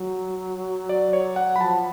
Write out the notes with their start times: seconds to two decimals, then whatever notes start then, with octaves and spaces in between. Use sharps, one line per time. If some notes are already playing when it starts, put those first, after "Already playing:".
Already playing: F#3
0.89 D5
1.13 C#5
1.36 F#5
1.56 B5
1.60 F3 A5